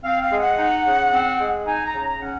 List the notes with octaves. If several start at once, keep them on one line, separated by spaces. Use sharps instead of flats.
C4 F5
F5
G#3
F#5
D#4
C#3
C4
G#3
D#4 G#5
A#5
C#3
A#5
C#4 F#5